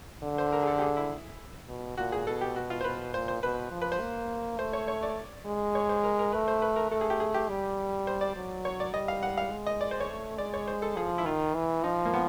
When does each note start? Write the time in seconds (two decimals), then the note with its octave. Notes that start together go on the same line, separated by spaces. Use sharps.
0.23 D3
0.38 C5
0.52 A#4
0.63 G#4
0.67 A4
0.78 G4
0.82 G#4
0.97 E4
1.69 B2
1.97 A#2 F#4
2.12 G#4
2.26 B2 A4
2.41 G4
2.56 F#4
2.70 F4
2.81 C5
2.84 B2 B4
3.14 A#2 C5
3.28 C5
3.43 B2 B4
3.71 F3
3.82 B4
3.92 C5
4.01 A#3
4.59 A3 C5
4.73 C#5
4.88 C#5
5.03 D5
5.46 G#3
5.75 C#5
5.89 C5
6.04 A#4
6.19 A#4
6.33 A3 B4
6.48 C5
6.62 B4
6.76 A#4
6.91 A3 A4
7.01 G#4
7.10 G4
7.20 G#4
7.34 G4
7.49 G3
8.07 C5
8.21 D5
8.36 F#3
8.65 C#5
8.80 D5
8.94 G3 D#5
9.08 F5
9.23 F#5
9.38 F5
9.51 G#3
9.67 D#5
9.81 D5
9.91 C5
10.00 C#5
10.10 A3
10.38 G#3 D5
10.54 C#5
10.68 C5
10.82 A4
10.96 F3 G#4
11.18 E4
11.26 D#3 F4
11.55 E3
11.84 F3 D#4
12.05 A#3
12.14 B3